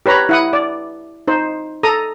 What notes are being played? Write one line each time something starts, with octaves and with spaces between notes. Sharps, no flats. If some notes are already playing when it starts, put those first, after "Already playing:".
G4 B4 C#5 A#5 B5
E4 F#5 D#6
D5
D#4 C5
A4 A#5 D#6